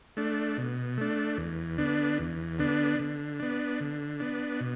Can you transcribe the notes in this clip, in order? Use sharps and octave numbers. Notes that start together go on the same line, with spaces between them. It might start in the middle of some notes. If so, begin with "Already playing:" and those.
A3 D4
B2
A3 D4
E2
D3 B3 D4
E2
D3 B3 D4
D3
B3 D4
D3
B3 D4
B2